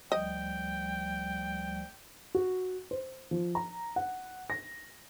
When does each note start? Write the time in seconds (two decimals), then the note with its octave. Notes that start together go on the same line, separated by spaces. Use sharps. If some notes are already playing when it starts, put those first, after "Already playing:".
0.12 D2 F3 G3 D#5 G5
2.35 F#4
2.91 C5
3.31 F3
3.55 A#5
3.96 F#5
4.50 A#6